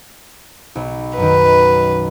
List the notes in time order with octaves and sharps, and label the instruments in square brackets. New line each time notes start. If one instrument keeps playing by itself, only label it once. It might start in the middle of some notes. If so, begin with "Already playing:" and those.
[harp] B1
[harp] F#2 D#3 [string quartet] B4